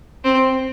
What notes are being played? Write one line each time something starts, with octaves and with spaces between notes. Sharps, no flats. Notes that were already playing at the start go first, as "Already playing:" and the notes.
C4